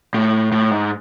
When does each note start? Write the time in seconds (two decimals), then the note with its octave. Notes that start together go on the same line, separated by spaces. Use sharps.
0.14 A2
0.52 A2
0.71 G#2